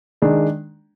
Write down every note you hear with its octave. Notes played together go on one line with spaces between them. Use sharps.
D#3 G#3 D4